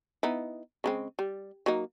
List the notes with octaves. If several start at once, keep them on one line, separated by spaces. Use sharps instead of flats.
B3 D#4 E4
C#3 G#3 C4
G3
F#3 A#3 D#4